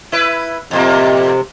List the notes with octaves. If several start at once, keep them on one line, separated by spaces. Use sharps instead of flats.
E4 B4
F2 A2 C3 A#3